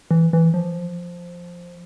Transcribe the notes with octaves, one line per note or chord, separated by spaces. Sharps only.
E3
E3
F3